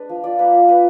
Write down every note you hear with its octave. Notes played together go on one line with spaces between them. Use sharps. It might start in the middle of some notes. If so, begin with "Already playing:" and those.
Already playing: G#3 D4 B4
F3
F4 D5
A#3 B4
F4
F4 B4